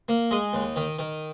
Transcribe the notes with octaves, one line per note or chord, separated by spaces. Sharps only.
A#3
G#3 D#5
D#2
D#3
D#3